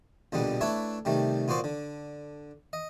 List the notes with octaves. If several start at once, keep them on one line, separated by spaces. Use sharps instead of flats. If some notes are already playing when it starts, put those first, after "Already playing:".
A#1 B2 D3 G3 B3
A3 D4 E4 B4 C#5 E5
C3 D#3 G3 A3
A#2 B3 F#4 C5 D5 C#6
D3
D#5